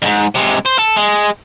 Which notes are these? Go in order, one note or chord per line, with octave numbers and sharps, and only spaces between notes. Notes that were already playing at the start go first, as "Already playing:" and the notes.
F2 G#2
C3 G#3
C5
A4
G#3